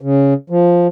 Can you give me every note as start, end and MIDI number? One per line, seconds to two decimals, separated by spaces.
0.01 0.34 49
0.50 0.87 53